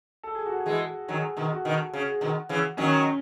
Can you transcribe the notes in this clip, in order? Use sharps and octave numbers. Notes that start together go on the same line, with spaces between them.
A4
G#4
F#4
G#4
E3 G#3
D#3 F#3 G#4
B2 D#3
F#4
B2 D#3
C#3
B2 D#3
C#3 E3
D#3 F#3 C#4